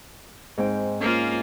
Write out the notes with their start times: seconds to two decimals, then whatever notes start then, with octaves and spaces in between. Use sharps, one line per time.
0.58 G#2 C4 G5
1.00 A#3 C#4 F4